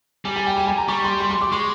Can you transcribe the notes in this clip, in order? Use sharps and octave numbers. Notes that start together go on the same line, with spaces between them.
G3 G#5
G#5
G5
G#5
G#5
A#5
G3 C#6
C6
C6
C6
D6
G#3 C#6